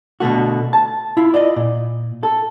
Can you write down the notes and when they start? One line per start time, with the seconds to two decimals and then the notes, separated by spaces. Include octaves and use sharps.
0.20 B2 D3 A3 F#4
0.73 A5
1.17 E4 F4
1.34 D5 D#5
1.56 A#2
2.23 A4